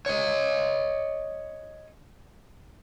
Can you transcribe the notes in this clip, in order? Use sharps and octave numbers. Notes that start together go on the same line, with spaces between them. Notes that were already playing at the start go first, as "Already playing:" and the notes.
C#5 D#5